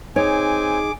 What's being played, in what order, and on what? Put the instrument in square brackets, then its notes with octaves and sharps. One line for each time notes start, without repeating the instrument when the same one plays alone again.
[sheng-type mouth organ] C4 G#5 [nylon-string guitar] D#4 [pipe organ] G#4 D6 [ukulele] C#5